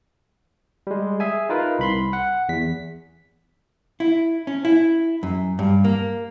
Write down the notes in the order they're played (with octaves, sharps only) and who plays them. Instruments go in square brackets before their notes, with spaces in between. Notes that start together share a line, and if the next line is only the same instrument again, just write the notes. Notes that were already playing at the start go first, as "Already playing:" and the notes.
[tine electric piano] G3 G#3
G#4 E5 G#5
D#4 F4 A#4 B4
C2 B5 C6
F#5
E2 B6
[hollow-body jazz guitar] E4
C#4
E4
F#2
G2
A#3